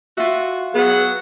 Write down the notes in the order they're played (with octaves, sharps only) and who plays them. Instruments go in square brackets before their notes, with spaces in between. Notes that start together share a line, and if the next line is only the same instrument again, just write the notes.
[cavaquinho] F4 E5 [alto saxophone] F#4
[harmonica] F#3 F#5 [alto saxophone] B3 [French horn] G#4